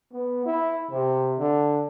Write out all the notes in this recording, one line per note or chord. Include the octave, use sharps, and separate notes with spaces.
B3
E4
C3
D3